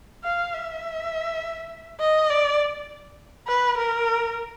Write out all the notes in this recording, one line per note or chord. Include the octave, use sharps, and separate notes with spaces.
F5
E5
D#5
D5
B4
A#4